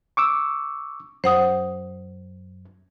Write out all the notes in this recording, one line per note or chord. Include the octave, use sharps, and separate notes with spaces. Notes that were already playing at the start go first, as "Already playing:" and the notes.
C#6 D6 E6
F#2 C5 F#5 D#6